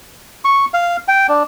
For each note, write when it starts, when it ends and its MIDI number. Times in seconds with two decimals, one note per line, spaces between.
0.45 0.65 85
0.74 0.97 77
1.08 1.27 79
1.29 1.43 62